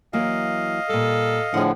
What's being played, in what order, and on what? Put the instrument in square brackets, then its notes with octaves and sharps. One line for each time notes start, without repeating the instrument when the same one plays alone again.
[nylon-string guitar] E3 F#3 A#3 [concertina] D#5 F5
[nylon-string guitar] A#2 G3 [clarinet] A4
[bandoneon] A2 D3 F3 [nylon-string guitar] G#4 F#5